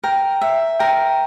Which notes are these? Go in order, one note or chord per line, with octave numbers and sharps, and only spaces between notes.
A#4 G5
E5
A#4 G5